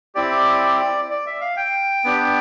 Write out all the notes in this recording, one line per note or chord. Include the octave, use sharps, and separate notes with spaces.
C4 E4 G4 D5
D5
E5
F5
G5
B3 D4 G4